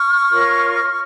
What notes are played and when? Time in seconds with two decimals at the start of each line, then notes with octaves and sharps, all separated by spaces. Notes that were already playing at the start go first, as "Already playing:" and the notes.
Already playing: C#6 F6
0.32 F4 A#4 C#5